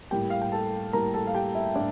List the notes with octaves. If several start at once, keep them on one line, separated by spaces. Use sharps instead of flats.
A2 G3 A#3 G4 G5
F5
G5
A4 A5
A2 G3 A#3 A#4 A#5
A4 A5
F5
G4 G5
E4 E5
A2 D4 D5